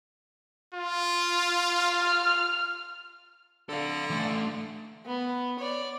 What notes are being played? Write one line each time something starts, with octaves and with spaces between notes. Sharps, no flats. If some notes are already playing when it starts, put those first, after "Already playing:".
F4
F6
D3 A4 F5
E3 A3
B3
C#5 D5